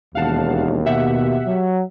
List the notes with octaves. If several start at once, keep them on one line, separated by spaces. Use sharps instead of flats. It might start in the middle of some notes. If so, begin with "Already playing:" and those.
E1 D#2 F5 F#5 A5
B2 G4 E5 F#5
F#3